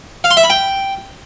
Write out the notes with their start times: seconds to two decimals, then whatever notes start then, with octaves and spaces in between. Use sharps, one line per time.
0.24 F5
0.31 C6
0.37 E5
0.43 B5
0.50 G5